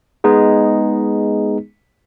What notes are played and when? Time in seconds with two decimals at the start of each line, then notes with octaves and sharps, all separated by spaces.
0.24 G#3 B3 D#4 G#4